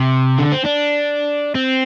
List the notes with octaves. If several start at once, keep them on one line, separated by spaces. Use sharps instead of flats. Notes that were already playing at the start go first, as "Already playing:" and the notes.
Already playing: C3
D3
C4
D4
C4